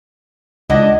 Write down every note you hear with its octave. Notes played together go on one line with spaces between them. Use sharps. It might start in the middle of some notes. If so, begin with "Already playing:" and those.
C#2 D4 E4 D#5 F#5 A#6